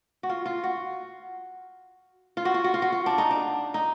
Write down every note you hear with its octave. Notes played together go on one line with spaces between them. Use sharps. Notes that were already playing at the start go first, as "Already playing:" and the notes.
F#4
F4
F4
F#4
F4
F#4
F4
F#4
F4
F#4
F4
D4
D#4
D4
D#4